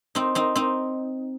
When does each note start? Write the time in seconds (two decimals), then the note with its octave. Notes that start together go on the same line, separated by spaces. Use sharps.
0.15 C4 D#4
0.35 C4 D#4
0.56 C4 D#4